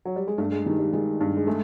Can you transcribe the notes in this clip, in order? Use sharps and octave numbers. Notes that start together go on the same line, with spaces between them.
F#3
G3
G#3
G2 A3
G#3
D#3 G3
G3
D#3 G#3
G2
G#3
G#3 A3